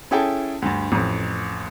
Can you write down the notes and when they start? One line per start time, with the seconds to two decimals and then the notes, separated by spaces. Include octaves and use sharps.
0.11 C#4 E4 G#4 A4 G5 A5
0.62 D2 G2
0.92 A1 F2